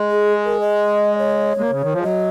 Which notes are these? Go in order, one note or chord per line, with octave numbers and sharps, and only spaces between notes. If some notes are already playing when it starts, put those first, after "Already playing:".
Already playing: G#3
G#4
A#4
D#5
C#5
G#3
A#3
C#3
D#3
F3
G#3
F#3 D#5